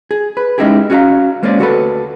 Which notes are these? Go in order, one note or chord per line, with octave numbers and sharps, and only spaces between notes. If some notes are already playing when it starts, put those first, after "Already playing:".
G#4
B4
G#3 C#4 D#4 E4 G4 G#4
C#4 F#4 G#4 D#5 F5 A#5
G#3 A#3 C4 C#4 E4 D5
D2 F#4 G4 A4 B4